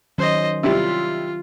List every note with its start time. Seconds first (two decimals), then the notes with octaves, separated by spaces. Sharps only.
0.18 D#3 F#3 C#4 C5 D#5
0.63 C3 G3 E4 F4